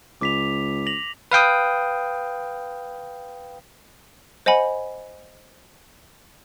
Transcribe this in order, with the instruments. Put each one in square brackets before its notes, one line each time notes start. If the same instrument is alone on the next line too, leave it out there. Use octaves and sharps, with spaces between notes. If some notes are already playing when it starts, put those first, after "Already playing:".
[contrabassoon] C#2 [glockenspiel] D6 B6 F7
[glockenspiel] A#6 F7 F#7
[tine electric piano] B4 F5 G5 D#6
[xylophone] C5 D#5 F#5 G#5 B5